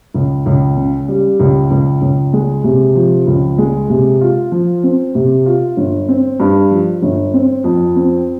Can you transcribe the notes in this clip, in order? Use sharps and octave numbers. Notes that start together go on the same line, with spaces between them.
C#2
C#2
C#3
G3
C#2
C#2
C#2
G#3
C3
F3
C#2
G#3
C3
F4
F3
C4
C3
F4
G1
C4
G2
F3
G1
C4
F2
C4